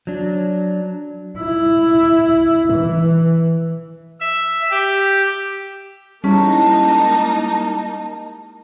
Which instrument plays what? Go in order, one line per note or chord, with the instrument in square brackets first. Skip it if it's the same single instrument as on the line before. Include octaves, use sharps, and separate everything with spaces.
[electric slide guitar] F#3 D4
[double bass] E4
E3
[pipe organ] E5
G4
[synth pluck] G3 G#3 E4 [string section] A#3 D#4 [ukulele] C#4 [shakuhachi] A5